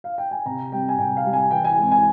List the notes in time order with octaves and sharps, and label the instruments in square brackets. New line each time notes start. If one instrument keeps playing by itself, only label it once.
[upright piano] F5
G5
G#5
C3 A#5
G3 C4 G5
G#5
C3 G5
F5
G3 C4
G#5
E3 G5
G#5
G#3 C4
G#5